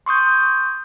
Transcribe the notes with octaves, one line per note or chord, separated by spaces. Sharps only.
C6 C#6 D#6 G6